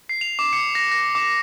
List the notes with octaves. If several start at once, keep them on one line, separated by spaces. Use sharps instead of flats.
C7
F7
D6
C#7
A#6
A#6
D6